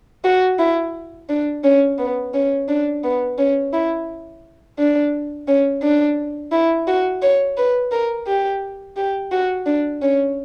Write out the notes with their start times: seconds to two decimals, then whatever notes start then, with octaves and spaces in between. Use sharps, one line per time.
0.24 F#4
0.59 E4
1.29 D4
1.64 C#4
1.98 B3
2.33 C#4
2.69 D4
3.04 B3
3.38 C#4
3.73 E4
4.78 D4
5.48 C#4
5.83 D4
6.52 E4
6.87 F#4
7.22 C#5
7.57 B4
7.91 A#4
8.27 G4
8.97 G4
9.32 F#4
9.66 D4
10.02 C#4